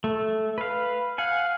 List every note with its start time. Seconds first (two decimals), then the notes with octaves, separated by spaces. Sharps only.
0.04 A3
0.58 B4 F5
1.18 F5 F#5 G#5